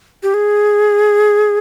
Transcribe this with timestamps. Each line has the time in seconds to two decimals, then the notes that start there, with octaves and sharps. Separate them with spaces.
0.23 G4
0.34 G#4